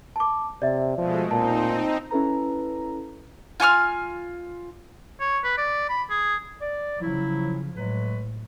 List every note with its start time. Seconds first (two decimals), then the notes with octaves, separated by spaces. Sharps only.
0.16 A5 D6
0.62 C3 D5 E5
0.98 B2 F3 G#3 A3
1.31 A#2 C4 D#4 A5
2.11 C#4 E4 A4 B4 A#5
3.60 F4 G#5 C#6 F6
5.20 C#5
5.44 B4
5.58 D5
5.89 B5
6.10 G#4
6.60 D5
7.00 C#3 F3 F#3 E4
7.75 A2 F#3 G#3 B4